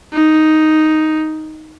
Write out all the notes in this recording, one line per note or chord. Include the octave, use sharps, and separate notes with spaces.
D#4